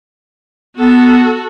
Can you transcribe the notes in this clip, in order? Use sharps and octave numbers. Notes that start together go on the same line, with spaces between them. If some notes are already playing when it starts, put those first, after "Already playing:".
B3 F#4 A4